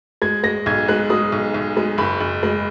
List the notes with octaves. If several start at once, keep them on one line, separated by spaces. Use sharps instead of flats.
G#3 G#6
G#3 A#6
B1 G#6
G#3 F#6
G#3 D#6
B1
B1
G#3
F#1 B5
F#1
G#3